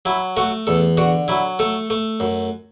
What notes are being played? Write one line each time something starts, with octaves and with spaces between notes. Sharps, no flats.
F#3 E4
A3 F#4
E2 A4
D3 F#4
F#3 E4
A3 A4
A3
F#2